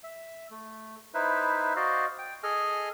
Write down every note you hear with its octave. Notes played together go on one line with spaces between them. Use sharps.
E5
A3
D#4 E4 B4 C5 E5
F#4 C5 D5 D#5 F5
G5
G#4 A4 D#5 G#5 F6